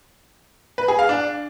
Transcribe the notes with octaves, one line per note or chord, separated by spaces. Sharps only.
B4
G#4
F5
D4